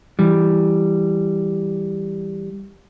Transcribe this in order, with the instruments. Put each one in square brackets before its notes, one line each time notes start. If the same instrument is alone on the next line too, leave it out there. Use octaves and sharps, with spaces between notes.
[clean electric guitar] E3 G3